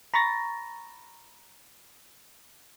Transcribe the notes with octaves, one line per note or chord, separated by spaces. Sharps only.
A#5 B5 C#6 A6 A#6